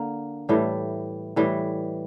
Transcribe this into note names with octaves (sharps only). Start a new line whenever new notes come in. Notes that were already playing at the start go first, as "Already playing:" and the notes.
Already playing: D3 A#3
A2 E3 G3
A2 E3 G3